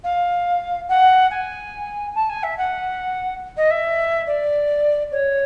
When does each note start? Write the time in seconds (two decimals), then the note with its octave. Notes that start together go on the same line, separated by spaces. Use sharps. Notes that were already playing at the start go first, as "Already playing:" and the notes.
0.04 F5
0.88 F#5
1.30 G#5
2.15 A5
2.29 G#5
2.43 E5
2.57 F#5
3.56 D#5
3.70 E5
4.27 D5
5.11 C#5